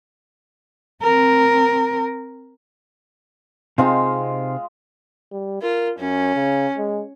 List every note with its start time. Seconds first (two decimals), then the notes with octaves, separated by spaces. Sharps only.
1.02 C4 A#4
3.78 C3 G#3 C4 D#4 F4 F5
5.32 G3
5.62 F4 A#4
5.99 F#2 C#4
6.35 C#3
6.78 G#3